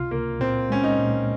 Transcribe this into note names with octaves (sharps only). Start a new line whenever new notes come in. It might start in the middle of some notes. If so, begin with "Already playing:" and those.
Already playing: C#2 C3 F4
C#2 A#3
A#2 C4
G#3 C#4
D#4
A#2